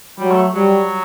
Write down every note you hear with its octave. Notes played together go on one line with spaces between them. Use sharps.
F#3 G3
A3
F#3 G3